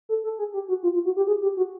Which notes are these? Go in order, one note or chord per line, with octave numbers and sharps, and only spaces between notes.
A4
A4
G#4
G4
F#4
F4
F4
F#4
G4
G#4
G4
F#4